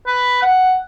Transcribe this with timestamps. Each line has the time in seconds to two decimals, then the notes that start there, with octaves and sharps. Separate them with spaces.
0.07 B4
0.42 F#5